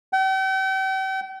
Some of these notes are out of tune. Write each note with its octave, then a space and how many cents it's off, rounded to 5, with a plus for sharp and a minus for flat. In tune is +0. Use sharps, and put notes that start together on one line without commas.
G5 -40